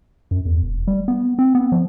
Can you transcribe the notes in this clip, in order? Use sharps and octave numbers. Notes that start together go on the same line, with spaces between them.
F#2
E2
E1
G3
B3
C4
B3
F3